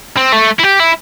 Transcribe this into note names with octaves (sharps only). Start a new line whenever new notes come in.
C4
A3
E4
G4
E4